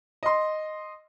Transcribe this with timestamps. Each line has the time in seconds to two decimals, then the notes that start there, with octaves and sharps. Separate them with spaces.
0.23 D#5 C6